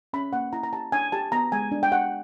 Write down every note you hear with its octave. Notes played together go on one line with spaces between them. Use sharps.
C#4 B5
A#3 F#5
E4 A#5
A#5
G4 A5
D4 G#5
G4 A5
B3 A#5
G#3 G#5
D4
G5
G4 F#5